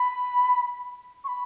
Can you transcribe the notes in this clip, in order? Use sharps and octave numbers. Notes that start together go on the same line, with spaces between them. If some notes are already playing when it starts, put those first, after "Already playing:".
Already playing: B5
C#6
B5